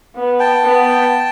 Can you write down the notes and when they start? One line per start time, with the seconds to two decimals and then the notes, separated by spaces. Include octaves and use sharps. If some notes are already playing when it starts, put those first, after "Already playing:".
0.16 B3
0.40 G5 A5
0.64 B3